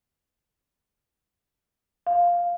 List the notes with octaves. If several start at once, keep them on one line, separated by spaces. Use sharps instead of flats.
F5